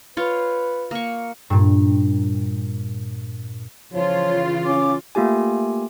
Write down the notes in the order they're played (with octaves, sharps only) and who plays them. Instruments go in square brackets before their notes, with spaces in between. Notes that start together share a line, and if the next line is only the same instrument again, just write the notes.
[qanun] F4 C#5 [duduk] B4
[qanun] A#3 C#6
[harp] G2 A#2
[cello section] C#3 E3 F4 [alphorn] F3 [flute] C#5
[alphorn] C#4 [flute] D6
[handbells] A3 A#3 F4 G4 G#5